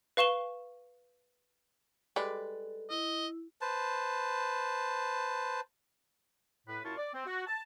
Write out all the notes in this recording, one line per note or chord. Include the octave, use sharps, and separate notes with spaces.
B4 F5 C#6 E7 G7
G3 G#3 G#4 A4 B4 D5
E4 D#5
B4 C5 A5
A2 B4
F#2 E4 F4 A5 C#6
D5
C4
F#4
A5